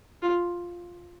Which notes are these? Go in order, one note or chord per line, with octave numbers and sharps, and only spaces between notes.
F4